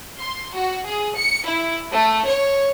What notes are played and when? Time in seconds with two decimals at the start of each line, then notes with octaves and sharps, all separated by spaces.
0.19 C6
0.54 F#4
0.86 G#4
1.17 C#7
1.47 E4
1.92 A3
2.26 C#5